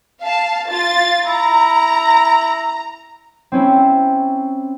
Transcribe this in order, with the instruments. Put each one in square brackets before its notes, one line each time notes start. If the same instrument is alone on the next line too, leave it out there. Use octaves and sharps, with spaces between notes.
[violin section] F5 A5
F4 A6
[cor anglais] E4 [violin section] A#5
[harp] C4 C#4 E4